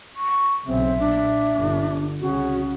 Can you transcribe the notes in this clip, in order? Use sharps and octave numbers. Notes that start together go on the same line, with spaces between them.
C#6
B1 C#3 C4 E5
A#2 D4
G1 D3
C2 C#3 C#4 F#4